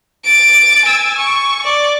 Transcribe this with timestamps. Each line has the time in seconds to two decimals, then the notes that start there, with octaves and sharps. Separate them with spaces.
0.25 A6 D7
0.85 G#5 E6
1.18 C#6
1.64 D5